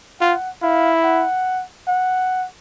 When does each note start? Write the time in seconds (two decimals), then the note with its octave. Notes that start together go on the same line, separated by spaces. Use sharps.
0.21 F4 F#5
0.62 E4 F5
1.04 F#5
1.88 F#5